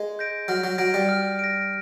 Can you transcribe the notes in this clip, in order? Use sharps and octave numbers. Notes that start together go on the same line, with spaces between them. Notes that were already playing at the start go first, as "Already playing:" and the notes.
Already playing: G#3
G6 A#6 D7
F#3 F6
F#3
F#3 A#6 D7
G3
F6
A#6 D7